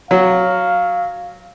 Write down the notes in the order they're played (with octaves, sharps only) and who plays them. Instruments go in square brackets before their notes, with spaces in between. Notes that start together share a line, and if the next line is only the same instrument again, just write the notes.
[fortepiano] F#3 [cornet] F5